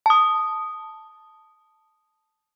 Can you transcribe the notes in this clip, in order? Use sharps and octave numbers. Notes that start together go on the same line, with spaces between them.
A5 D#6